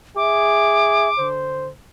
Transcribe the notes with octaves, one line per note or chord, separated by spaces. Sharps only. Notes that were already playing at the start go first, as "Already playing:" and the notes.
G#4 E5 D6
D3 C5